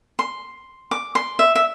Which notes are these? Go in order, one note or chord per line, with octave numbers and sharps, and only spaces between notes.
C6
D6
C6
E5
E5